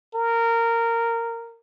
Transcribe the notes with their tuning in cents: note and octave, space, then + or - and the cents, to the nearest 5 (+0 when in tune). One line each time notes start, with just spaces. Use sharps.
A#4 -15